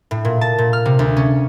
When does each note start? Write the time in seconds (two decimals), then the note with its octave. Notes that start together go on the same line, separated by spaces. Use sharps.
0.11 A2
0.25 A#2
0.41 A5
0.58 A#2
0.73 F6
0.85 C3
0.99 D2
1.17 C#4